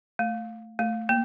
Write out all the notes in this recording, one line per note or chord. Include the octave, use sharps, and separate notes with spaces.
A3
A3
A#3